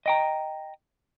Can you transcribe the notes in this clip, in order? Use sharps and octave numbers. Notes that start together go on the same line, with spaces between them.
D#5 G5 A#5